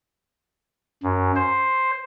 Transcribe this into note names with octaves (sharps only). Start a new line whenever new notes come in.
F#2
C5